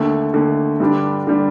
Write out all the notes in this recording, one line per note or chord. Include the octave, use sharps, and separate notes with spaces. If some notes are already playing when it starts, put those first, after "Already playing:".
Already playing: D#2 D3 A3
D#2 D3 A3
G2 D3 G3 D4 G4
D3 G3 D4 G4